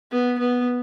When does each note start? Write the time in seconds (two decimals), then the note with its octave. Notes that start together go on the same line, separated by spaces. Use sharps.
0.11 B3
0.39 B3